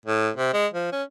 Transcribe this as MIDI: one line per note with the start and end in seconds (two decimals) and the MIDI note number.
0.05 0.29 45
0.36 0.52 48
0.53 0.67 56
0.74 0.91 53
0.92 1.02 61